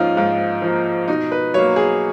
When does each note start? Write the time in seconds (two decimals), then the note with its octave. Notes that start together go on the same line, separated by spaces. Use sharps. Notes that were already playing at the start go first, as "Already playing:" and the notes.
Already playing: G#2 F3 A#3 C#4 D#4 F4
0.17 G#2 F4
0.62 F3 A#3
1.08 B2 D#4
1.32 B4
1.54 F#3 A#3 C#5
1.76 G#4